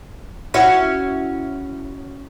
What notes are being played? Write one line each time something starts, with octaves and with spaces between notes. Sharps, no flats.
C#4 E4 F#4